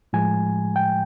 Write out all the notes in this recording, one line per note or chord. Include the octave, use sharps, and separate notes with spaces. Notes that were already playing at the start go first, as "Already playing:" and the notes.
A2 F3 G#3 G#5
G5